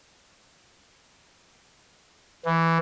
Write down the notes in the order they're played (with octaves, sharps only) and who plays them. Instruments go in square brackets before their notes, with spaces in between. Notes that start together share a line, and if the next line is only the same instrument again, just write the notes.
[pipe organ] E3